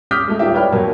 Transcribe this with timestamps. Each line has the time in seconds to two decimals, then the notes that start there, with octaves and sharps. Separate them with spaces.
0.11 D6 D#6 F6 G6 B6
0.28 G#3 A3
0.39 D#1 D#3 F4 G4 E5
0.54 B4 C#5 D5 G5 B5 F6
0.72 B2 F#3 A#3